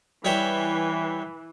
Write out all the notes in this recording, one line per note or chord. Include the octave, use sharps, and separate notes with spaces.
E3 G3 C#5 E5